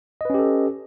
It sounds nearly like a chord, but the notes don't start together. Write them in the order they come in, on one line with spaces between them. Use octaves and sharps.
D#5 B4 C#4 G4 A4